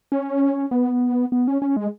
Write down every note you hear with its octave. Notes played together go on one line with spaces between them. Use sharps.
C#4
B3
B3
C#4
C#4
G#3